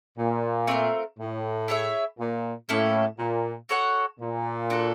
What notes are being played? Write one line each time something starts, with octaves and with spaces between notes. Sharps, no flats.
A#2
A3 C4 F4 A#4
A2
E4 G#4 C#5 E5
A#2
A2 A#3 C#4 E4 A4
A#2
F#4 A4 C#5 F#5
A#2
D4 F#4 A4